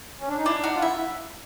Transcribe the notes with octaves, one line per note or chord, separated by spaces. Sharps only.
C#4
D4
D#4
D4 E4
D#4 F#4
F4
E4 E5